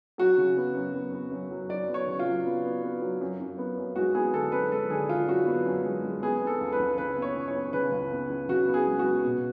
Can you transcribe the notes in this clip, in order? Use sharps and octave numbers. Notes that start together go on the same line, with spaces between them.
F#3 F#4
C#3
B3
F#2
B3
B3
F#2
F#3
F#3 D5
B3
C#5
C#3
F4
F#3
B3
B3
B3
F#3
F#2
F#2
B3
F#2
G#3 F#4
B3 G#4
D3 A4
F#2 B4
G#3 A4
D3 G#4
D3 F4
F#2 F#4
B3
F#2
G#3
G#3
B3 G#4
B3
A4
C#2
B4
C#2
C#3 B4
B3
C#5
C#2
C#5
B3
C#3 B4
C#2
B3
C#2
C#3 F#4
B3
G#4
G#3
F#4
B3
B2